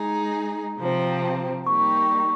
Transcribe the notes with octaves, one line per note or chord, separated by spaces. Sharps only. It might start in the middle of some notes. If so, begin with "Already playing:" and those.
Already playing: G#3 D#4 G#4 A#5
C3 F3 C4
G3 A#3 D#4 G4 C#6
C#6